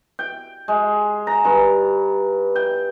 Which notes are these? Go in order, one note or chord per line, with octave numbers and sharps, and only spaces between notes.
G5
G#3
A#5
G2
G5